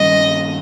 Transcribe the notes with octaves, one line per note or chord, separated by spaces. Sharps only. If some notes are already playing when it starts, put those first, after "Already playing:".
Already playing: G2 D#3 G3 C#4 D#5